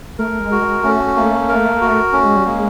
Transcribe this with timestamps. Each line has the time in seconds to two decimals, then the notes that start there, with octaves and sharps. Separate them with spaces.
0.19 A3 A#4
0.40 G#3
0.52 F#4
0.61 G#3
0.83 A3 C#4
1.16 A#3
1.48 A#4
1.81 F#4
2.13 A3 C#4
2.25 G#3
2.36 G3
2.46 G#3 A#3